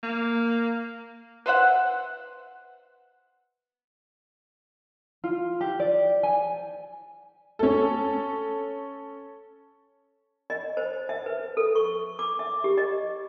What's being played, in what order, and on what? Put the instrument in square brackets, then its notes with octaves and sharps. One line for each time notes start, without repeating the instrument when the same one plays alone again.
[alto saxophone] A#3
[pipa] B4 C5 E5 F#5
[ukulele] F4
G4
D5
G#5
[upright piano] C#4 A4
[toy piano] D#5
C5
E5
B4
A4
C#6
D6
E5
G4
D#5